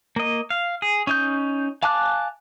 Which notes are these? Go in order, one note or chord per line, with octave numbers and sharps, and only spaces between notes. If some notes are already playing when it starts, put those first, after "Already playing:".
A#3 D#5
F5
G#4
C#4 D#4 G6
F5 G#5 A5 D6 F#6